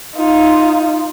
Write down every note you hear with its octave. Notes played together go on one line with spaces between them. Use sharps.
D#4 F4